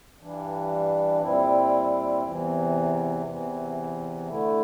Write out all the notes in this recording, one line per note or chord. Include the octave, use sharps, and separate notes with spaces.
G2 E3 G3 D4
A#2 G3 C4 E4
E2 C3 E3
E2 C3 E3
D3 A3 E4